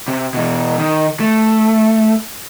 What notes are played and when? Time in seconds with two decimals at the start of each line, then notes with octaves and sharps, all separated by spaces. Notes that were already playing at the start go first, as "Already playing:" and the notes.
0.08 C3
0.34 B2 E3
0.78 D#3
1.20 A3